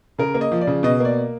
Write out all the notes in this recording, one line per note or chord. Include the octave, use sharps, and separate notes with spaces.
C#3 A#4
A#3
D#5
F3
D5
C#3
B2 D#5
A#3 D5